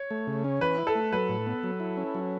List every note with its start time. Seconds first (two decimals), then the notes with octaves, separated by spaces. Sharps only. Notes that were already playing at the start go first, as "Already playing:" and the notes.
Already playing: C#5
0.11 A3
0.27 C#3
0.44 C#4
0.61 E3 B4
0.78 E4
0.87 A4
0.95 A3
1.12 F#3 B4
1.29 A2
1.47 B3
1.63 F#3
1.80 E4
1.97 C#4
2.15 F#3